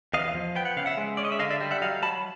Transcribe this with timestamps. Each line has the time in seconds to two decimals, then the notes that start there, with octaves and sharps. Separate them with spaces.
0.14 E2 D#5 F5
0.35 F3
0.56 B3 G5
0.65 F#5
0.77 C#3 F5
0.86 E5 F#5
0.97 G#3
1.17 C#4 D5
1.25 D#5
1.32 E5
1.39 D3 D#5 F5
1.50 D5 E5
1.61 G3
1.71 E5 F#5
1.82 F#3 D#5 F5
2.02 F#3 A5 B5